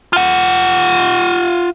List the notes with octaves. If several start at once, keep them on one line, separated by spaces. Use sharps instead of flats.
F4 F#5